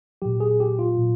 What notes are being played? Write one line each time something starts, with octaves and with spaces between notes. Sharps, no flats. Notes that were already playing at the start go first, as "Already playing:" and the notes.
A#2 F#3 G4
G#4
G4
F4
A#2 F#3